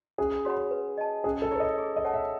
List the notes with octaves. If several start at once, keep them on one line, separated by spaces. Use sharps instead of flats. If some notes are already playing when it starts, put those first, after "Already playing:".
C#4 G#4
F#4 C#5 F#5 B5
B4
D#5 A5
C#4 G#4
A4
E4 B4 C#5 D#5
G#4
D#5
C#5 F#5 A5
E5